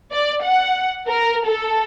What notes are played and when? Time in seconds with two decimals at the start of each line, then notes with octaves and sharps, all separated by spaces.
0.12 D5
0.43 F#5
1.08 A#4
1.45 A4